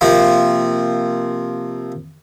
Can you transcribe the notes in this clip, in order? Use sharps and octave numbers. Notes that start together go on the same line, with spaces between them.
C3 F3 A#3